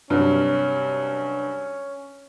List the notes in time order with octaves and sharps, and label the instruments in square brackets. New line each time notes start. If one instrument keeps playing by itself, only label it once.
[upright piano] G2 C3 F#3 [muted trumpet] C#4